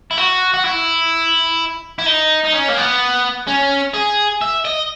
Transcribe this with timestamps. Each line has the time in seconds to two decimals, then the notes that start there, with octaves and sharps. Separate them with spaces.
0.11 E4
0.18 F#4
0.54 F#4
0.65 E4
1.99 E4
2.06 D#4
2.44 D#4
2.53 C#4
2.68 A#3
2.77 B3
3.47 C#4
3.94 G#4
4.42 E5
4.65 D#5